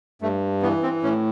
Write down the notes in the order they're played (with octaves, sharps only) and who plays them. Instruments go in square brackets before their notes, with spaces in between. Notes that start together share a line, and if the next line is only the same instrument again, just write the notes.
[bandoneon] G2 A3
E3 B3
C4
A2 C#4